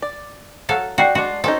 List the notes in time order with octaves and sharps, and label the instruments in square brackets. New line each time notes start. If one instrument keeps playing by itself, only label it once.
[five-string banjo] D5
[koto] F#3 A4 F5
[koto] F#4 [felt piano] D5 G5 C7
[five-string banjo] G#3 D4 [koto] F#4 [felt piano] D5
[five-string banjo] C4 C#4 D#4 [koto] A4